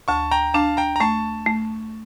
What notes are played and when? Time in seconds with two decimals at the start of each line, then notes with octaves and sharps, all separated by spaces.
0.08 D2 A5 C#6
0.31 G5 A#5
0.54 D4 F5 A5
0.77 G5 A#5
0.96 A#5
1.00 A3 A5 C#6
1.46 A3